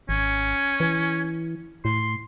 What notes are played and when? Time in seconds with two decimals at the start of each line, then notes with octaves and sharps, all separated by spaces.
0.09 G#1 C#4
0.80 E3
1.85 A2 C6